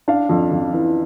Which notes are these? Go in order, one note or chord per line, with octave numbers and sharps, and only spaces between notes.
D4 F5
F2
F2
E3